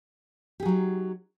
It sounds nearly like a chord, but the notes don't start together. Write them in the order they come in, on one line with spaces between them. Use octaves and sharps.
G4 G#4 F#3 D#4